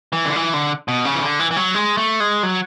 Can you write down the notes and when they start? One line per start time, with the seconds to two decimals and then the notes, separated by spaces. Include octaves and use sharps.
0.13 E3
0.25 D3
0.36 E3
0.54 D3
0.88 B2
1.05 C#3
1.15 E3
1.22 D3
1.39 E3
1.51 E3
1.57 F#3
1.75 G#3
1.97 A3
2.20 G#3
2.43 F#3